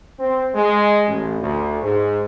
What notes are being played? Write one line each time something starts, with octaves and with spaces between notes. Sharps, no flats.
C4
G#3
A1
D2
G#2